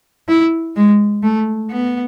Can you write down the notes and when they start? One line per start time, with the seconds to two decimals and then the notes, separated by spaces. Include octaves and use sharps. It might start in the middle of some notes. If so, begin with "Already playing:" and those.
0.28 E4
0.76 G#3
1.23 A3
1.70 B3